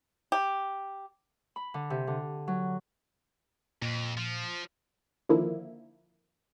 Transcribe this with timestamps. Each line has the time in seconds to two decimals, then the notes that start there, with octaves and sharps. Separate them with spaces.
0.32 G4
1.56 B5
1.74 D3
1.90 C3
2.07 D3
2.48 F#3
3.82 F2 A#2
4.17 F3
5.29 D3 D#3 F3 A#3 E4